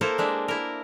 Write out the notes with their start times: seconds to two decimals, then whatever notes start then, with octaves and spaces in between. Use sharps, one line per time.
0.01 A#3 E4 A4 A#4 C5
0.18 G#3 D4 E5
0.48 E4 A#4